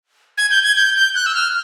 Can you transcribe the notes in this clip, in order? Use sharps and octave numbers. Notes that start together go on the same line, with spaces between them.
G#6
G6
G#6
G6
G6
F#6
E6
F6